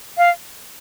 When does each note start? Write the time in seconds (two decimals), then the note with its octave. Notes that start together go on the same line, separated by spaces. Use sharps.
0.18 F5